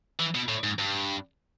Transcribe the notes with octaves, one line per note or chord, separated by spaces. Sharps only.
E3
B2
A2
G#2
G2